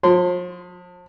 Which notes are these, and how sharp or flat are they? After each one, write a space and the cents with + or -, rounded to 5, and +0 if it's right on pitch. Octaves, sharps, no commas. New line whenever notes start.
F3 +40 C6 -15